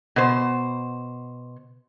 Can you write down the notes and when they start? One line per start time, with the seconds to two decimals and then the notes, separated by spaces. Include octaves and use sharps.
0.16 B2 C5